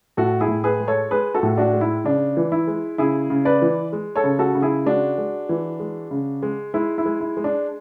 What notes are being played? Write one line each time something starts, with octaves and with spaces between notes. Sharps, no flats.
A2 F#4 A4
E4 G#4
A2
G#4 B4
G#3
A4 C#5
G#3 G#4 B4
F#4 A4
A2
D4 F#4
G#3
E4
C#3 D4
E3
E4
G#3
C#3 E4 G#4
C#3
B4 D5
E3
G#3
A4 C#5
C#3
F#4 A4
C#3
E4 G#4
G#3 D4 F#4
G#3
E3
G#3
C#3
G#3
G#3 E4
E4
G#3
E4
G#3
D4